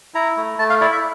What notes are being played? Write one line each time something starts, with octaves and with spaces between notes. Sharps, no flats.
E4 A#5
A3
A3 A5
F5
E4 D5
E5